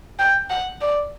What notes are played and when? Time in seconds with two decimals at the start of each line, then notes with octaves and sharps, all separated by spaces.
0.19 G5
0.50 F#5
0.81 D5